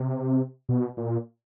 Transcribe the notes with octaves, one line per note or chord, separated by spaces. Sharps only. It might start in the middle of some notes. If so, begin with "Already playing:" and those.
Already playing: C3
B2
A#2